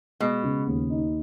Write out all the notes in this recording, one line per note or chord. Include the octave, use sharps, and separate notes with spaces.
B2 G#3
C#3
D#2
D#4